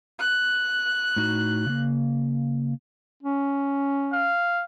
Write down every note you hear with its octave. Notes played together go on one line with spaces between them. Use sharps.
F#6
A2 D#4 F#4
C#3 A#3
C#4
F5